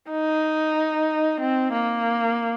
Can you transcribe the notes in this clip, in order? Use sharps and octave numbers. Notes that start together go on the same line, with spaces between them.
D#4
C4
A#3